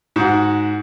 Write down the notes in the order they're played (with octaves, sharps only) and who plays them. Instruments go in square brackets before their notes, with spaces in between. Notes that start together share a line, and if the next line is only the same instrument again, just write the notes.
[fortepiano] G#2 F#4